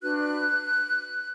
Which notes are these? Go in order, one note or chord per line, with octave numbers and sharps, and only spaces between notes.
D4 F#4 B4 F#6